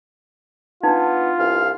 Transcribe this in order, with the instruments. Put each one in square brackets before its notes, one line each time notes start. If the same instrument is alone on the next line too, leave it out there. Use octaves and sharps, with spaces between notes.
[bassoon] B3 [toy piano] D4 D#4 [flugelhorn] F4
[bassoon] C2 [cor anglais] F5